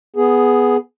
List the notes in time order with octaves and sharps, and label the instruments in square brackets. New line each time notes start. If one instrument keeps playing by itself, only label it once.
[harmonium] B3 G#4